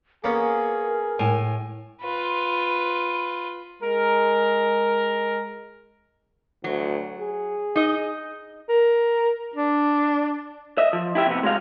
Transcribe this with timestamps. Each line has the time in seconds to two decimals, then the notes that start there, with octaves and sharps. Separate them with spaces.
0.24 A#3 B3 C#4 G#4 A#4
1.19 A2 G#5
2.02 F4 B4
3.81 G#3 A#4
6.64 D2 F#3
7.20 G#4
7.76 D#4 D#5
8.69 A#4
9.56 D4
10.78 D#5 E5
10.93 F3
11.15 E4 G4 E5
11.27 C3 B3
11.43 G#3 F#4 F5